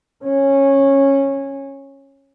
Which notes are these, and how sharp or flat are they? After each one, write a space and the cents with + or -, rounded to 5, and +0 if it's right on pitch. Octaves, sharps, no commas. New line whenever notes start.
C#4 -15